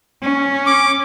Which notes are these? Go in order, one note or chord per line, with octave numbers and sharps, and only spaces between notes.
C#4
D6